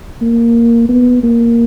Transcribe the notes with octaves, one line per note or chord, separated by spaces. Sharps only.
A#3
B3
A#3